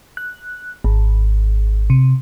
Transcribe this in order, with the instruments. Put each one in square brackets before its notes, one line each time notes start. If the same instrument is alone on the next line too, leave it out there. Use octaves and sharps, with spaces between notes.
[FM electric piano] F#6
G#1
C3